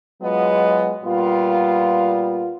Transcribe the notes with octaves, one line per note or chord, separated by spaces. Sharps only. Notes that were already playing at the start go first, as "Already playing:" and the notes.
F#3 G#3 B3 F4 D#5
A#2 G3 B3 F4